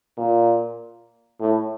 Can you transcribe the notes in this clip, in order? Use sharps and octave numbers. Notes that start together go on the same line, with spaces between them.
A#2
A2